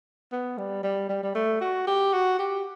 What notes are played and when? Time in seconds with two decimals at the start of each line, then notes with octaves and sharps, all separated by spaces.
0.32 B3
0.58 G3
0.83 G3
1.09 G3
1.23 G3
1.35 A3
1.61 F#4
1.87 G4
2.13 F#4
2.39 G4